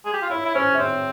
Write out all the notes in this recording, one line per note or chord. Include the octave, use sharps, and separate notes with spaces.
G#4
G4
F4
E4 C#5
E4
C#4 C5
E5
C4 C#5